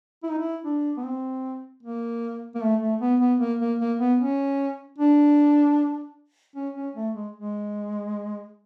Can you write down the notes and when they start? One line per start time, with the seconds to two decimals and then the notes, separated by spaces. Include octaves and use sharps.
0.23 E4
0.31 D#4
0.39 E4
0.64 D4
0.97 B3
1.03 C4
1.83 A#3
2.55 A#3
2.62 A3
2.81 A3
3.01 B3
3.20 B3
3.40 A#3
3.59 A#3
3.79 A#3
4.00 B3
4.19 C#4
4.98 D4
6.56 C#4
6.76 C#4
6.95 A3
7.15 G#3
7.36 G#3